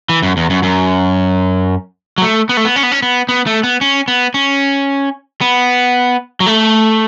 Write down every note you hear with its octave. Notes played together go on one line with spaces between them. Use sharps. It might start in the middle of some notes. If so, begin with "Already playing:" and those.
E3
F#2
E2
F#2
F#2
F#3
A3
B3
A3
B3
C#4
B3
C#4
B3
B3
A3
B3
C#4
B3
C#4
B3
F#3
A3